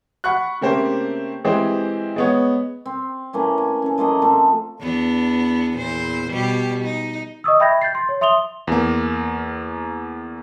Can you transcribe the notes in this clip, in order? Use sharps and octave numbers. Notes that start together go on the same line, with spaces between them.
F#5 B5 C#6 F#6
C#3 A3 A#3 C4 G4 C5
E3 G#3 C4 G4 C5
G#3 B3 C#5
C4
E3 A3 A#3 C#4
G#5
C#4 A4
F3 A3 A#3 D#5
F3 A3 C4
E2 B3 D4
E2 A#2 C5
B2 G3 G4
D#4
D#5 C#6 D#6 E6
E5 G5 B5 G6 G#6 A#6
G6 A6 C7
C6
C#5
E5 C6 D#6 F7 G7
E2 A#3